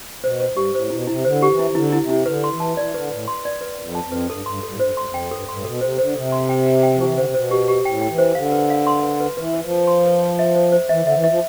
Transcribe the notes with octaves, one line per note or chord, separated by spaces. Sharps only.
B2 C5
C5
G2
G4
A2 C5
B2 E4
C3 E4
D3 C5
G4
E3
E4
E3
D3 E4
E4
C3
E4
D3 B4
C6
E3
A5
E3 D5
D3 B4
A2 B4
C6
D5
B4
F2 B4
A5
F2
B4
G2 A4
G2 C6
G2 A4
A2
G2 C5
G2 C6
F2
G5
G2 A4
G2 C6
A2
B2 A4
C3 C5
D3 C5
C3 A4
C6
G5
G5
G5
F3
E3 G4
D3 C5
C3
B2 C5
G4
G4
A2 G5
G5
E3
C5
D3 F5
B4
F5
C6
B4
B4
E3 B4
B4
F3
B4
C6
B4
F5
E5
C5
C5
E3 E5
D3 E5
E3
F3 E5